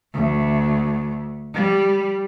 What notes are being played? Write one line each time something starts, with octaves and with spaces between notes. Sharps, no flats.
D2
G3